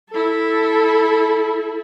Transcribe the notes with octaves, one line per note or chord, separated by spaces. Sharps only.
E4 A4